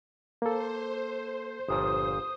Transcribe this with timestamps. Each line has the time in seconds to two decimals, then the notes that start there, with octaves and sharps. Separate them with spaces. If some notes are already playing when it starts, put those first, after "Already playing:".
0.42 A#3 A4 C5
1.68 G1 A#2 F3 D#6